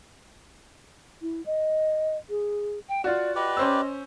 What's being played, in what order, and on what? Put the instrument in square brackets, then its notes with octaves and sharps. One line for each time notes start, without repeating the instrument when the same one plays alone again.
[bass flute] E4
D#5
G#4
[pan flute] G5
[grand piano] F4 F#4 [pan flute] D5
[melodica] G4 B4 D5 [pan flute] D#5
[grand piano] C#4 C5 E6